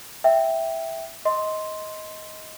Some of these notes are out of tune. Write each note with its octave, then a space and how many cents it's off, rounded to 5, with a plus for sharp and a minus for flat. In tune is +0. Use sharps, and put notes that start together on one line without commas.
E5 +0 G5 +0
D#5 +15 C6 +0